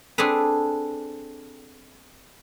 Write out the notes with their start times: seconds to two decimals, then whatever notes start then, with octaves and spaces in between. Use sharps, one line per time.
0.18 C4 D4 G#4 A4 B4